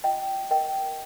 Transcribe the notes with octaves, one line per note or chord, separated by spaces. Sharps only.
F4 D#5 G5
A#4 D#5 G5